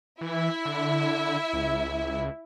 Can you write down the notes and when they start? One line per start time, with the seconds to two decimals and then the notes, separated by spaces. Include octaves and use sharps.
0.21 E3 E4 E5
0.65 D3
1.53 C#2